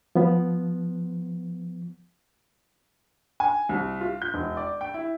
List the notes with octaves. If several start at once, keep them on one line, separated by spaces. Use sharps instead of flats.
F3 B3
G#5
C2
F4
G6
E1
D5
G5
E4